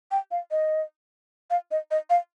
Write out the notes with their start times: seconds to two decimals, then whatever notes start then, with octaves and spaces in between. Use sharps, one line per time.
0.11 G5
0.31 F5
0.51 D#5
1.50 F5
1.71 D#5
1.91 D#5
2.10 F5